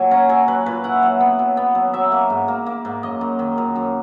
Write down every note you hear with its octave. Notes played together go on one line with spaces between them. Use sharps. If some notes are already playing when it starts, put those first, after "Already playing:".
Already playing: A#2 F#3 G#5
C#4 A#5
F#3 G#5
F#3 B4
A#2 B4
E4 F#5
F#3
B3
F#3
B3
F#3
F#3 E5
A#3
G#2
A#3
A#3
G#2
F#2 D#5
F#2
D#3
F#2
F#2